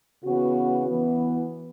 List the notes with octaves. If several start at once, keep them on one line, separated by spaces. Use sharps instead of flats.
C#3 E3 B3 F#4
E3 B3